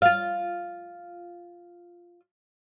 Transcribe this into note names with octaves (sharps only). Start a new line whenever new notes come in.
F4 F5